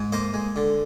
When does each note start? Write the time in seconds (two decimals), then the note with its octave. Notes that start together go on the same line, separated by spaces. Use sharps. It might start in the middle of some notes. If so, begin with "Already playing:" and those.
Already playing: G#2
0.12 A#3 C5 D#5
0.34 G#3
0.56 D3